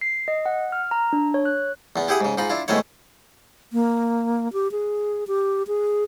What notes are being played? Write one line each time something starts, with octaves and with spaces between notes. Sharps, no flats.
C7
D#5
F#5
F6
A#5
D4
C#5
F#6
E2 B3
E4 G4 G#4 F#5 D#6
G#2 C#3
G#2 D#4 F4 B5
D4 E4 F4
G#2 B2 D#3 A3 E4 C#5
A#3
G4
G#4
G4
G#4